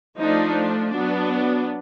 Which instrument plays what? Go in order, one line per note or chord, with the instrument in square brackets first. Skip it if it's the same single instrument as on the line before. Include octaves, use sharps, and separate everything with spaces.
[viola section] F3 A3 D4 D#4
F#3 B3 D4